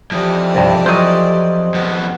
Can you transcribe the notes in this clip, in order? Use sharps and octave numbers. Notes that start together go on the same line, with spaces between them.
F2 E3 G4 D5
C2 G2
F3 F#3 C5 D#5
F2 B3